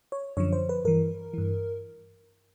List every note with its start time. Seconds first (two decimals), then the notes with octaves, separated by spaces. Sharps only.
0.12 C#5
0.37 F#2 D3 F3 C#5
0.52 C5
0.69 B4
0.85 G2 E3 A#4
1.34 G2 E3